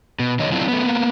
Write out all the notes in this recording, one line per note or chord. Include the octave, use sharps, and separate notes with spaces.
B2
F2 D3 D#3 F#3 C#5 D#5
F#3 C4 D4 E4 F4
A3 B3
A#3 B3